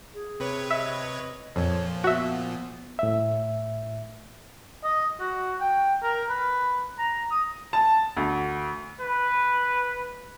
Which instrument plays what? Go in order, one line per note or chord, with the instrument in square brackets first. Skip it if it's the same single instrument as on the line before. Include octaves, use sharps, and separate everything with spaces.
[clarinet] G#4
[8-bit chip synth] C3 B4 C#5
[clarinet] D#5 [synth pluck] E5
[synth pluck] F2 [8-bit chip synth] A#2 F3 [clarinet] C#5
[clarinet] B3 [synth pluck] F#4 E5
[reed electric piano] A2 E5
[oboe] D#5
F#4
G5
A#4
B4
A#5
D#6
[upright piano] A5
D2
[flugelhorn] B4